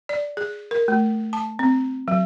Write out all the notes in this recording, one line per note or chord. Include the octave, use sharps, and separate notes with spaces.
D5
G#4
A#4
A3
A5
C4
F#3